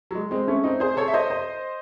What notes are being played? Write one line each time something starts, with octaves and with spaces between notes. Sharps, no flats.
F#3
G#3
G#3 C4
A3 C#4
C4 D#4
G#4 C5
A4 C#5
E5
C5 D#5
C5 D#5